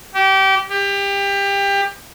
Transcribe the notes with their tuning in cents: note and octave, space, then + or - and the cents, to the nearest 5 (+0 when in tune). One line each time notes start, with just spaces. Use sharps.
G4 -25
G4 +25